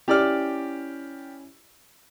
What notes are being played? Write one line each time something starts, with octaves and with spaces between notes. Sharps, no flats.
C#4 E4 G4 D5 F6